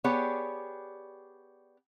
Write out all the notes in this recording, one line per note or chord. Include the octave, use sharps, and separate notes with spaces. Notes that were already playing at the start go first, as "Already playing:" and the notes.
B3 G4 G#4 C#5 D5